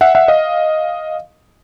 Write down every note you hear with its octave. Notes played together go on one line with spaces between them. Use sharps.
E5 F#5
E5 F#5
D#5 F5